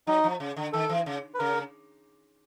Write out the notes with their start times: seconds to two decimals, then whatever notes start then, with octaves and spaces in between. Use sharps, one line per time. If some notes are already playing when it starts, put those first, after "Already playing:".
0.07 F#3 D#4
0.24 F3
0.40 C#3
0.56 D3
0.73 D#3 A4
0.89 E3
1.06 C#3
1.34 B4
1.39 C#3 A#4